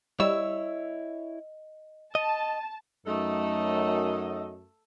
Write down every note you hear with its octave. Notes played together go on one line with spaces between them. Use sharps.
G3 E4 C#5 D#5 E6
D#5 A5 D#7
F#2 A3 D#4 A4 D#5